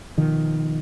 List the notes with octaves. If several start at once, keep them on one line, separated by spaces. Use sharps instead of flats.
B2 D#3 F3